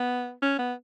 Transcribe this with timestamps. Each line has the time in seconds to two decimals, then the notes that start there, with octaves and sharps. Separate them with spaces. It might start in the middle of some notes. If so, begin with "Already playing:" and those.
Already playing: B3
0.42 C#4
0.59 B3